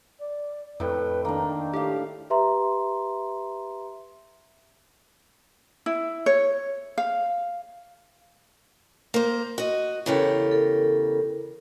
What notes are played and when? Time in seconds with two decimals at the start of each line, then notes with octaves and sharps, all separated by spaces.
0.20 D5
0.80 F2 A2 B4 G5
1.25 D#3 A#3 D4
1.73 A2 G4 F5
2.30 G4 B4 E5 A#5 C6
5.86 E4
6.26 C#5
6.98 F5
9.14 A#3 C5
9.58 F#4 D#5
10.06 E2 C#3 G4 A4 A#4 C#5
10.51 A4 A#4